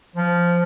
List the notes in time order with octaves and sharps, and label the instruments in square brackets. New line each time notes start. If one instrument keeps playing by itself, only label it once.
[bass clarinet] F3